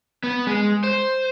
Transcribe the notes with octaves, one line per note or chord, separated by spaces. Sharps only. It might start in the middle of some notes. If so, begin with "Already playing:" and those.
B3
G#3
C5